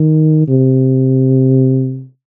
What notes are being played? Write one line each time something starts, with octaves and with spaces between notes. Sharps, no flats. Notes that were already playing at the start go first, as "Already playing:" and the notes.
Already playing: D#3
C3